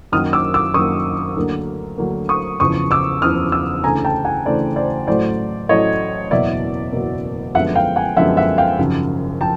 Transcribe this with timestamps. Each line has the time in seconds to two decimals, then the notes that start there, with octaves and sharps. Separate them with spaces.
0.12 F#2 D#3 F#3 A#3 D#6 F6
0.33 D6 E6
0.54 D6 E6
0.74 F#2 D#3 F#3 A#3 C#6 D#6
1.36 D2 D3 F#3 A#3
1.98 D2 D3 F#3 A#3
2.29 C#6 D#6
2.60 F#1 E2 C#3 F3 C#6 D#6
2.91 D6 E6
3.22 F#1 E2 C#3 F3 D#6 F6
3.52 D6 E6
3.84 D2 C#3 E3 A3 G#5 A#5
4.04 G5 A5
4.25 F#5 G#5
4.45 D2 C#3 E3 A3 C5 D5
4.76 C5 D5
5.07 A1 A2 F#3 A3 C5 D5
5.69 A1 A2 F#3 A3 C#5 D#5
6.31 F#1 E2 B2 F#3 A#3 D5 E5
6.93 F#1 E2 B2 F#3 A#3
7.55 F#2 D3 F3 G#3 B3 E5 F#5
7.75 F5 G5
7.96 F#5 G#5
8.17 F#2 D3 F3 G#3 B3 E5 F#5
8.37 E5 F#5
8.58 F5 G5
8.79 G#1 F#2 C#3 F3
9.41 F3 G5 A5